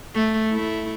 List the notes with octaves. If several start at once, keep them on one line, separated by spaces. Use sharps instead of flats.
A3
A3 E4